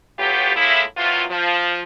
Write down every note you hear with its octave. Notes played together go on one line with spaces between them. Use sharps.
A2 F#3 B3 F4 G4
A2 G#3 A#3 E4
C3 E3 F#3 F4
F3